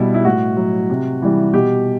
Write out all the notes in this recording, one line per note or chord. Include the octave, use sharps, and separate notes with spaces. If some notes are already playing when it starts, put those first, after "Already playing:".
Already playing: B2 G3 E4
E4
A2 F#4
F#3
C3
E3 G3
B2 G4